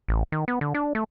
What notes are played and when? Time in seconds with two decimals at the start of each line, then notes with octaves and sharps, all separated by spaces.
0.08 A1
0.32 D#3
0.48 B3
0.61 D3
0.74 D4
0.95 A3